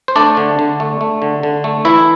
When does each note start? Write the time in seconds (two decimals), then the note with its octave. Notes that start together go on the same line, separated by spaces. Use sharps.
0.08 C5
0.16 A3 D4 D5
0.37 D3
0.59 D3
0.80 A3
1.01 A3
1.22 D3
1.43 D3
1.64 A3
1.85 E3 E4 E5